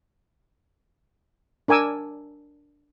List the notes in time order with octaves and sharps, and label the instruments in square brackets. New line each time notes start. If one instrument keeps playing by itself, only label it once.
[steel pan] D4 A#4 G#5 D6 E6